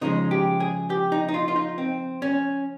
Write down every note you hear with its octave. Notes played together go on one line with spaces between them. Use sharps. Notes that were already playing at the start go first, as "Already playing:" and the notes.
C#3 F3 G#3 D#4
G4
G#4
G4
D#4
D#4
F4
F4
D#4
C4
C#4